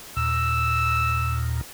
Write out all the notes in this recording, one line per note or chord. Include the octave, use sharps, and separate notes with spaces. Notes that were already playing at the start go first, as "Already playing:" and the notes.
D#2 A#2 E6